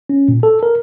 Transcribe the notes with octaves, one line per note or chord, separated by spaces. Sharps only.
C#4
A#2
A4
A#4